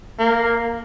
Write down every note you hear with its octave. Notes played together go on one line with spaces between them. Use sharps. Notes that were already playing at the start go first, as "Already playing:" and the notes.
A#3